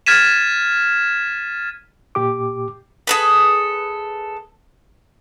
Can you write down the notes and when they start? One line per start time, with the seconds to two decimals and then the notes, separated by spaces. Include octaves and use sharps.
0.06 F6 G#6 A6 B6 D#7 E7
2.15 A#2 G4 D6
3.07 G#4 A4 B4